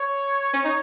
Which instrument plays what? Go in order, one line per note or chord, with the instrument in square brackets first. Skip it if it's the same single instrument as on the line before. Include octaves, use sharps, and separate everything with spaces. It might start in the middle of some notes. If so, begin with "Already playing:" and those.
Already playing: [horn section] C#5
[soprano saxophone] C#4
D#4